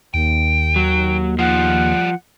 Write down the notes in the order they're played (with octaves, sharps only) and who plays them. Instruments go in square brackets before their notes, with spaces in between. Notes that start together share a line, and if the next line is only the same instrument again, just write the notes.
[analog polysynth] D#2 [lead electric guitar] G5
[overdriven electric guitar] F#3
[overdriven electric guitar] F3 [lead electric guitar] G3 G#4 [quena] F#5